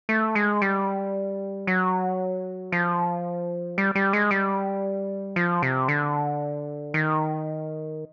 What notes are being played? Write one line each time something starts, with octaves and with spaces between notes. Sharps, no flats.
A3
G#3
G3
F#3
F3
G3
G3
G#3
G3
F3
C3
D3
D#3